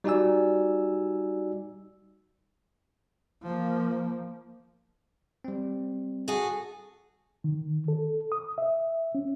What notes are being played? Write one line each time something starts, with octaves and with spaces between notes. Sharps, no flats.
G3 D#4 F#4 D5 G#5 E6
F3 A#3
G3 C4
F#4 G#4 A4
D#3
A4
D#6
E5
C#4